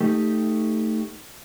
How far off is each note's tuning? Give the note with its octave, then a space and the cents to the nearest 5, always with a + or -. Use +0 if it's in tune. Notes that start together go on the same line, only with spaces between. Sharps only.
A3 +10 D#4 +5 G4 +0